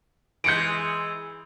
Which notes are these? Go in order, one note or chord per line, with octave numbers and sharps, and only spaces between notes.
E3 G#3 G6 C#7 D7